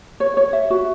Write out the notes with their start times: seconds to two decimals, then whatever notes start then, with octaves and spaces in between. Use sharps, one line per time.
0.20 C#5
0.37 C#5
0.53 E5
0.70 F#4